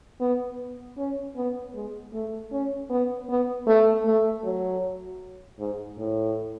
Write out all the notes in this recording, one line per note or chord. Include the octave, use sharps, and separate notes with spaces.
B3
C#4
B3
G#3
A3
C#4
B3
B3
A3
A3
F#3
G#2
A2